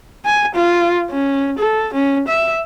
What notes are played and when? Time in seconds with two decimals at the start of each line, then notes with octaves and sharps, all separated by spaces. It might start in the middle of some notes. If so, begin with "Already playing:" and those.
0.25 G#5
0.55 F4
1.10 C#4
1.58 A4
1.94 C#4
2.28 E5